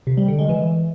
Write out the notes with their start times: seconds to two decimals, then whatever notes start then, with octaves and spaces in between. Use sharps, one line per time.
0.07 C3
0.17 G3
0.28 D3
0.39 G#3
0.49 E3